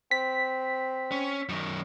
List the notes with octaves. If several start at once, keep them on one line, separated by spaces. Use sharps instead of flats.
C4 B6
C#4
F#2 D#3